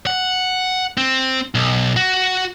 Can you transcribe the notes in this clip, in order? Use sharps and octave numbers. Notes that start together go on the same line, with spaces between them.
F#5
C4
B1
F#4